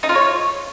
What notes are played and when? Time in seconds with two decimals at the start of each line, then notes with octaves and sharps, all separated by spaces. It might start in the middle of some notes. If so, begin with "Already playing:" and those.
0.03 D#4
0.09 F4
0.15 C#5